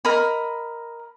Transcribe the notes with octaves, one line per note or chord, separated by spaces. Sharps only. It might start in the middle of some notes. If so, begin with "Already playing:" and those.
A#4 D#5 B5